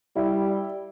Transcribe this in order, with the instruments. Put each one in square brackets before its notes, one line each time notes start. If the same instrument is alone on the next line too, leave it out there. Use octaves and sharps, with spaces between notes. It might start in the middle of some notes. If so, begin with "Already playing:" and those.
[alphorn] G3 [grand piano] E4